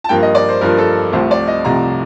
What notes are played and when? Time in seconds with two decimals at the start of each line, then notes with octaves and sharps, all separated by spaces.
0.04 A5
0.09 G2 F3 A#3 G5
0.22 D#5
0.35 D5
0.48 C5
0.61 G2 F3 A#3 A#4
0.78 A4
1.12 C2 C3 F3 A3 C5
1.31 D5
1.48 D#5
1.64 C2 C3 F3 A3 A#5